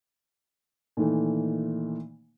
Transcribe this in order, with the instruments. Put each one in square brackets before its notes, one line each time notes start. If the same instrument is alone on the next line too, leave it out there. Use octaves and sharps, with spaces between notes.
[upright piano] A#2 D#3 E3 A3